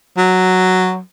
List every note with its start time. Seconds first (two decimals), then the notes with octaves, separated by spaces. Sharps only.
0.18 F#3